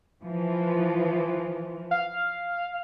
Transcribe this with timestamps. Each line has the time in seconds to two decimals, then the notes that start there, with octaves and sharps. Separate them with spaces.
0.22 E3 F3
1.91 F5